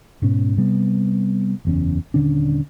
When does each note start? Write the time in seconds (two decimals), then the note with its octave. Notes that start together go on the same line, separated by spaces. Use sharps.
0.22 G#2 B2 C#4
0.57 C3 G3 B3
1.65 F#1 E2 C#4
2.14 D#1 D3 C#4 D4